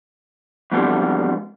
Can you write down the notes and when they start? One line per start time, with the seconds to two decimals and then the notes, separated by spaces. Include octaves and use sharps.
0.72 F2 G#2 B2 D3 E3 G3